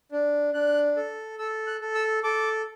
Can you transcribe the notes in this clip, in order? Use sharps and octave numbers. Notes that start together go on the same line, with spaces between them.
D4
D4 F#6
A4
A4 E6
F#6
A4
E6
A4 D6